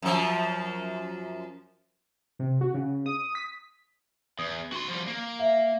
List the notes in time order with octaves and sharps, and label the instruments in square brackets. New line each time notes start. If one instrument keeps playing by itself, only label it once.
[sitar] F#2 F3
[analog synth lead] C3
F#4
C#3
D#6
B6
[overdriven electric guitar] E2 [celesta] D#6
[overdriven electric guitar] F#4 C6
F3 G3
A#3
[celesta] E5 F5